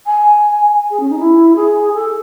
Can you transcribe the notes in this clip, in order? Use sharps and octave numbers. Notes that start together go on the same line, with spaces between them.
G#5
G#4
C#4
D#4
E4
G#4
A4